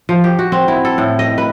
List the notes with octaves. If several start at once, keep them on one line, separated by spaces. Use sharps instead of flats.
F3
G4
F#4
C4
E4
A4
A2
D#5
B4